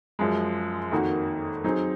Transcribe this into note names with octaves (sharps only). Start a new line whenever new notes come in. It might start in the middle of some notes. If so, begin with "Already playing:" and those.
F#2 F3 G#3
F2 D#3 A#3 D#4 F#4
F#3 C4 D#4 G#4